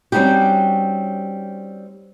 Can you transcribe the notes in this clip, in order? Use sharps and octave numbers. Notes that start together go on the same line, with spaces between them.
G3 C4 C#4 D#4 F#4 G4